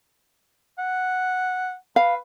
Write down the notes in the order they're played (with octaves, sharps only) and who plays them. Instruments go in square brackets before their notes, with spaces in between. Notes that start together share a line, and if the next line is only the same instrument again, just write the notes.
[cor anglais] F#5
[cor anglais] B4 [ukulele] F5